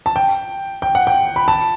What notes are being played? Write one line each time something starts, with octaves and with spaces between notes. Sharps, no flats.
A5
G5
G5
F#5
G5
B5
A5